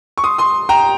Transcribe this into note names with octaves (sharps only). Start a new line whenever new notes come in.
C#6
C6 D#6
C6 D#6
G5 A#5